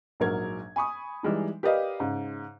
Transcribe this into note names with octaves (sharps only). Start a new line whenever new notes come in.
A#1 G#2 F#3 A#4 G#6
G#5 B5 C#6 D#6
E3 G3 G#3 D#4
G4 A#4 B4 D5 D#5 F5
G#2 C#3